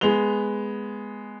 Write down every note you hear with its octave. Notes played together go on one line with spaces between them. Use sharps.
G#3 B3 F7 G7